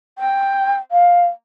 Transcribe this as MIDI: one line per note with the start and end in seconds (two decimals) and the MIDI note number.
0.18 0.75 79
0.91 1.26 77